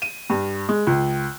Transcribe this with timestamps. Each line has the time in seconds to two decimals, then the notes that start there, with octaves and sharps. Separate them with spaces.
0.02 D#7
0.30 G2
0.69 G#3
0.87 C#2